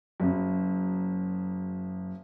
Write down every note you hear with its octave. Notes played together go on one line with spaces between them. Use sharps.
F#1 F#2